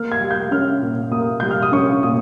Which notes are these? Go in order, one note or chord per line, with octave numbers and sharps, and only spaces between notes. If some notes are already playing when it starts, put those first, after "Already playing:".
Already playing: A#3 F6
G#6
G3
G6
C#4 F6
A#2
A#3 D#6
G3 G6
F6
D#6
C#4 C#6
A#2 D#6